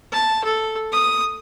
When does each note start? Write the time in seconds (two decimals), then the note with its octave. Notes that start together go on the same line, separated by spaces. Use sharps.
0.12 A5
0.44 A4
0.92 D#6